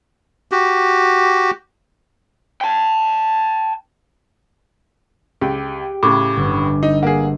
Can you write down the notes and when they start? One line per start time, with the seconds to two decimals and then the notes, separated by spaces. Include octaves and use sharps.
0.52 F#4 G4
2.61 G5 A5
5.41 C#2 G4
6.03 A2 C#3 D6
6.37 G1
6.83 D#4
7.03 A#3 G#4 F#5